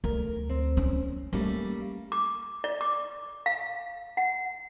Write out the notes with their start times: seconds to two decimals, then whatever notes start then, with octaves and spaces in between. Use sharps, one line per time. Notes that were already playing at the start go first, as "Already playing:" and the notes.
0.04 D2 A#4
0.49 C4
0.77 C#4
1.33 G3 A3 A#3 C#4
2.12 D6
2.64 D5
2.81 D6
3.46 F5
4.17 F#5